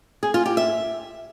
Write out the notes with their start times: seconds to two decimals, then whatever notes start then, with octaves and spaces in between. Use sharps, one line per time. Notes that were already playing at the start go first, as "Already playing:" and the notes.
0.23 G#4
0.34 F4
0.46 G4
0.57 E5